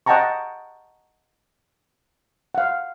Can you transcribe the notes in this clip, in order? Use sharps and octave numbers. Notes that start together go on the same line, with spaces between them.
D#5 F#5 G5 A5 A#5 C#6
F5 F#5